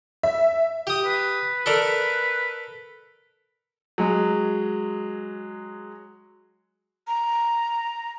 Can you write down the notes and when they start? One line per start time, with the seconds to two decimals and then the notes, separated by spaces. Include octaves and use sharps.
0.23 E5
0.87 G4 D#6
1.05 B4
1.66 A4 A#4 D5
3.98 F#3 G#3
7.07 A#5